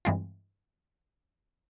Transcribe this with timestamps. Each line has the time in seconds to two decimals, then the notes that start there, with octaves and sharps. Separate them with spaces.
0.05 G2 E3 G#3 C4 F4